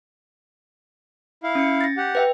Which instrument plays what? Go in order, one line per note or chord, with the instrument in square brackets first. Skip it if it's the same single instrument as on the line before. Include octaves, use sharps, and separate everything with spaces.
[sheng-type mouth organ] E4 F5
[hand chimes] C#4 C#7
A6 A#6
[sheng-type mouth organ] G4 F#5
[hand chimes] B4 E5 G5